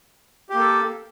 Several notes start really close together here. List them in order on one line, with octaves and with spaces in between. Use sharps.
G4 A#3 A4